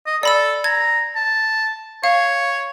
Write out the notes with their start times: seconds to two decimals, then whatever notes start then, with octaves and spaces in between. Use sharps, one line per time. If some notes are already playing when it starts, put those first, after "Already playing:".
0.06 D#5
0.23 A4 D5 B5 E6
0.64 A#5 G#6
1.16 A5
2.04 C#5 F5